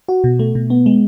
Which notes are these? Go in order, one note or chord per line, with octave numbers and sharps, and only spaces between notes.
F#4
B2
A3
B2
B3
G#3